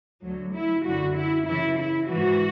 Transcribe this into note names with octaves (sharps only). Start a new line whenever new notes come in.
D2 D3 F#3
E4
F#2 D3 F#4
E4
F#2 C#3 E3 E4
E4
G#2 E3 F#4